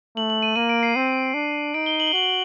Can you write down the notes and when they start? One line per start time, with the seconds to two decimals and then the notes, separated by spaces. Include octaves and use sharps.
0.17 A3 F#7
0.30 F#7
0.42 D#7
0.56 A#3 D#7
0.69 D7
0.83 C7
0.96 C4
1.34 D4
1.74 D#4 D7
1.86 G7
2.00 F#7
2.07 G7
2.13 F#4 F#7